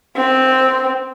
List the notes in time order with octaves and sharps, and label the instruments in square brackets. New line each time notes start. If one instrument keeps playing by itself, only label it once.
[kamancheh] C4